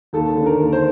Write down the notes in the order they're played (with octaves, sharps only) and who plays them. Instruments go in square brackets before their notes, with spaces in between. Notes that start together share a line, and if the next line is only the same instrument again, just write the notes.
[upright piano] D#2 A4
D3
A#4
D#2
C5